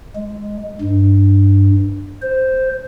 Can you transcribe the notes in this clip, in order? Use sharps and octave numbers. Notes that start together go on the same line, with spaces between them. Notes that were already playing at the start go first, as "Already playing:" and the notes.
G#3
G2
C5